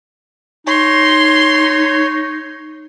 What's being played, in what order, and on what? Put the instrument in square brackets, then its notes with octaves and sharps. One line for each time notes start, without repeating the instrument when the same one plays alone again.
[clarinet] D#4 [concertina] C#5 [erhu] C6